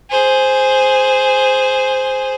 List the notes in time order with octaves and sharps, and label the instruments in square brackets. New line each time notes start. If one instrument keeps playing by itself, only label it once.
[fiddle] G#4 C5